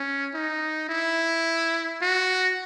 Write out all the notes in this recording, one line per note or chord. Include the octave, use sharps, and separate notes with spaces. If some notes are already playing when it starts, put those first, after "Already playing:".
Already playing: C#4
D#4
E4
F#4